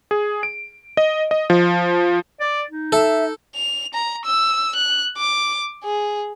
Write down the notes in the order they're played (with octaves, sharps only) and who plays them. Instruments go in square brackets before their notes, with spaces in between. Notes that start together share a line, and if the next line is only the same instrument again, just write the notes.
[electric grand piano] G#4
D7
D#5
D#5
F3
[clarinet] D5
D#4
[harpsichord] A4 [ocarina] E5
[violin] F7
A#5
E6
F#6
D6
G#4